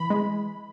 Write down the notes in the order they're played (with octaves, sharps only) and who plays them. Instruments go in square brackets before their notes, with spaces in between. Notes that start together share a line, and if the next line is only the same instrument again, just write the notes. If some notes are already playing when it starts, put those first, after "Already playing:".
Already playing: [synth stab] E3 B5
G#3